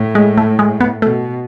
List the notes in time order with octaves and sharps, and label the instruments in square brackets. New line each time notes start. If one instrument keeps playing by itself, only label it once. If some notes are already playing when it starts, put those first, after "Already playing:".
Already playing: [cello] A2
[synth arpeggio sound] G#3
A3
G#3
B3
[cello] B2 [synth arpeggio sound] A3